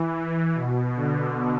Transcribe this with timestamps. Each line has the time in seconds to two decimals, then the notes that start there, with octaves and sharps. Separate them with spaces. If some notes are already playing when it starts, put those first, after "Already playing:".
Already playing: E3
0.55 B2
0.96 D3